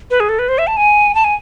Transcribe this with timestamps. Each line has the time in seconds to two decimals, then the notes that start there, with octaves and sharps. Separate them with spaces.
0.11 B4
0.20 G#4
0.29 A4
0.39 B4
0.49 C5
0.58 E5
0.67 A5
0.77 G#5
1.15 A5
1.24 G#5